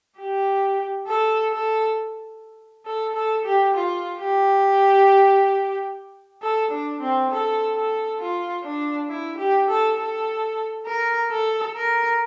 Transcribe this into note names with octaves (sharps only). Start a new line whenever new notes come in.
G4
A4
A4
A4
A4
G4
F4
G4
A4
D4
C4
A4
A4
F4
D4
E4
G4
A4
A4
A#4
A4
A#4